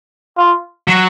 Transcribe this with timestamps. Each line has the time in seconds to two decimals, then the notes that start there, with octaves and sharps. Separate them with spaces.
0.37 F4
0.88 F#3